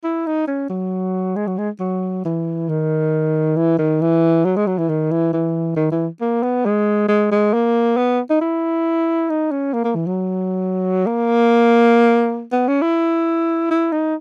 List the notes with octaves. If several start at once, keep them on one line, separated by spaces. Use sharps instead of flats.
E4
D#4
C#4
F#3
G#3
F#3
G#3
F#3
E3
D#3
E3
D#3
E3
F#3
G#3
F#3
E3
D#3
E3
E3
D#3
E3
A#3
B3
G#3
G#3
G#3
A#3
B3
D#4
E4
D#4
C#4
A#3
A#3
E3
F#3
A#3
B3
C#4
E4
E4
D#4